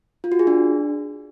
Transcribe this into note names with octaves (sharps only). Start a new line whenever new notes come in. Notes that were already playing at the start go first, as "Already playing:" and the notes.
F4
F#4
G#4
D4